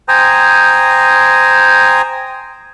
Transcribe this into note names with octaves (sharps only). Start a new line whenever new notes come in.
C5 G5 G#5 A#5 D#6